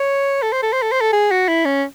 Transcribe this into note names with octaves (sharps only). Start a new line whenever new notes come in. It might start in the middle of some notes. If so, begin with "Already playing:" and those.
Already playing: C#5
A4
C5
A4
C5
A4
C5
A4
G#4
F#4
E4
C#4